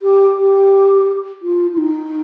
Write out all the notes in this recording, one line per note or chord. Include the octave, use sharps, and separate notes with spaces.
G4
G4
F4
F4
D#4